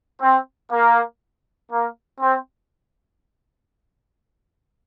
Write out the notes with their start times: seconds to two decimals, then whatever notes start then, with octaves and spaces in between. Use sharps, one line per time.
0.21 C4
0.71 A#3
1.71 A#3
2.21 C4